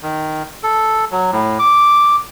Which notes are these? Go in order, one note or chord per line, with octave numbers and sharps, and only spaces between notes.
D#3
A4
F#3
A2
D6